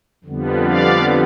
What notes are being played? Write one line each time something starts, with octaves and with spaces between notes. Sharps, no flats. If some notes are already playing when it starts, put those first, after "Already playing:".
F2 D3 G3 B3
D5 F5